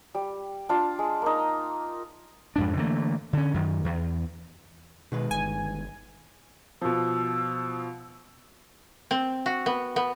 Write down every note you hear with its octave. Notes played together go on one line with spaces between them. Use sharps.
G3
D4 F4
G#3
A#3 D#4
F2 G#2 D4
D3 E3 A3 A#3
D3 C#4
F#2 D#3
E2
B2 D#3 G#3 B4
G1 G#5
B2 F3 E6
C4
F#4
B3
B3